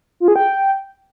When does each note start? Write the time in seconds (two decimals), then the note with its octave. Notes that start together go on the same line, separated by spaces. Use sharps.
0.20 F4
0.28 G#4
0.36 G5